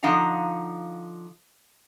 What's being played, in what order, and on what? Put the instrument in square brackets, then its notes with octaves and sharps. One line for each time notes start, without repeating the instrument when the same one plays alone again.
[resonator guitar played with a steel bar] D3 F3 D#4 F5 F#5 A#5